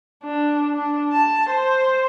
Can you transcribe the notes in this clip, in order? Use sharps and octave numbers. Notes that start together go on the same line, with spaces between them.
D4
D4
A5
C5